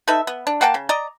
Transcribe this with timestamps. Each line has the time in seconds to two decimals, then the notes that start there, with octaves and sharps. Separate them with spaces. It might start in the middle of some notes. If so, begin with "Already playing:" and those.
0.08 D#4 A4 B4 E5
0.27 B3
0.47 D4
0.61 A#3 F#5 G5 A5
0.74 C#3
0.89 D5 D#5 A#5